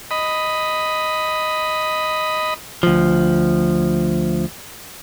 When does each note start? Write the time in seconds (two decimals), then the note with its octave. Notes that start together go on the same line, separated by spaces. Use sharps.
0.11 D#5 B5
2.83 D2 F3